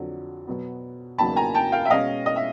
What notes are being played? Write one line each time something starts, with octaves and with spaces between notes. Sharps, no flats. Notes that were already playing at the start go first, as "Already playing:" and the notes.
Already playing: F2 D3 F#3
B2 F#3 B3
E2 C#3 F#3 A#3 D#4 A5 B5
G#5 A#5
G5 A5
F5 G5
E5
B2 G#3 C#4 D#5 F5
D#5
E5